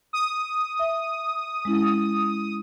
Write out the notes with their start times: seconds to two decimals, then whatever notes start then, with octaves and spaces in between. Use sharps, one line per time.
0.13 D#6
0.79 E5
1.65 G#3 C#4 E4